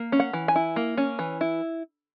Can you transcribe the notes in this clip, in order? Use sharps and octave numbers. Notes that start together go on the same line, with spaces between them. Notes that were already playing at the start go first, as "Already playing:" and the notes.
Already playing: A#3
C#4
F#5
E3
G#5
E4
A#3
C#4
E3
E4